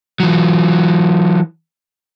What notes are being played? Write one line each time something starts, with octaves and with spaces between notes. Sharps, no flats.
E3 F#3